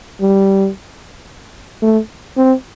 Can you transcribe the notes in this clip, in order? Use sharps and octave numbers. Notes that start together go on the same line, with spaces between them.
G3
A3
C4